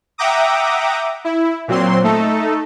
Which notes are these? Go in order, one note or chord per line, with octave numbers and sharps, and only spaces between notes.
E5 F#5 G5 A#5 D6 D#6
E4
A#2 F#3 C4 C6
A3 D#4 A4